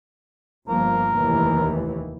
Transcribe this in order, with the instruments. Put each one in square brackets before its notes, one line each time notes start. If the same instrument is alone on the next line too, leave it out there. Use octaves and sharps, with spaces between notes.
[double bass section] G1 F3 A#3 [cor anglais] A#4
[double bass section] F1 D#2 E3